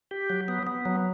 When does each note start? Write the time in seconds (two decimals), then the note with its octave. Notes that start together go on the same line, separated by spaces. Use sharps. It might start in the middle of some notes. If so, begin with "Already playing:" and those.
0.11 G4
0.30 F#3
0.48 B3
0.67 B3
0.85 F#3